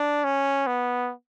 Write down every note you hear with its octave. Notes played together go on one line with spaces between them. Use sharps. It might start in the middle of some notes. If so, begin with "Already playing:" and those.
Already playing: D4
C#4
B3